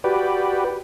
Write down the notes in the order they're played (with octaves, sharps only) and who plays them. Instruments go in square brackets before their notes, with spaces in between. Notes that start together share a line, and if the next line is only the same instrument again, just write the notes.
[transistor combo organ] F#4 G4 B4 D5